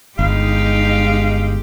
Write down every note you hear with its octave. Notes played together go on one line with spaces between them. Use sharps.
G1 G#3 D#4 G4 F5